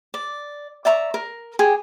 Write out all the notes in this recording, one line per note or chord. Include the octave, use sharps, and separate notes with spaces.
D5
D5 E5 A#5 C#6
A#4
G4 G#4